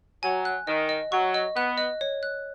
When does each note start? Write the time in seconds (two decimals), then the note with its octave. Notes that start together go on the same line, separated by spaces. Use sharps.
0.23 F#3 G#5
0.45 F#6
0.67 D#3 D#5
0.89 D#5
1.12 F#3 C#6
1.34 D#5
1.56 B3 F#6
1.78 D#5
2.01 C#5
2.23 F#6